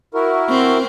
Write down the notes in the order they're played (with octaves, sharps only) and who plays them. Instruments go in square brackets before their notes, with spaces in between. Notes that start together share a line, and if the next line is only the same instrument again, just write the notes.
[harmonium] E4 F#4 A#4
[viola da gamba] C4